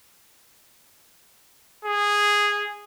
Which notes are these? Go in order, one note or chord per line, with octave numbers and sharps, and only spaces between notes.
G#4